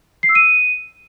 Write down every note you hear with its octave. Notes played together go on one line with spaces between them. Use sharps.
C7
E6
D#7